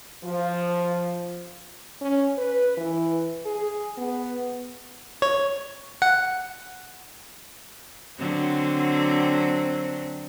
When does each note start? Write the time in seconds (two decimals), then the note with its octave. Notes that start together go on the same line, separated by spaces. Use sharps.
0.24 F3
2.01 C#4
2.38 B4
2.77 E3
3.45 G#4
3.98 B3
5.22 C#5
6.02 F#5
8.19 D3 F#3 C4